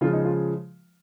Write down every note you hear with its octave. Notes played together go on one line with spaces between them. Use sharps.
C#3 F3 G#3 F4
D#4
F4